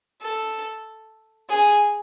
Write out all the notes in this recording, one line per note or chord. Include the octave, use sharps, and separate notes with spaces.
A4
G#4